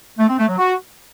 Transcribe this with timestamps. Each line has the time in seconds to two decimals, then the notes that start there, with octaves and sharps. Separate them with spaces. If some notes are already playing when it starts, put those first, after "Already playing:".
0.19 A3
0.29 C4
0.38 A3
0.48 F#3
0.58 F#4